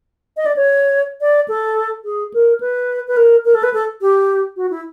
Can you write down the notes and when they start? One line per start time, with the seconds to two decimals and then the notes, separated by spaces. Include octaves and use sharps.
0.37 D#5
0.46 D5
0.56 C#5
1.21 D5
1.48 A4
2.04 G#4
2.34 A#4
2.60 B4
3.08 B4
3.17 A#4
3.45 A#4
3.55 A4
3.63 B4
3.74 A4
4.01 G4
4.57 F#4
4.71 E4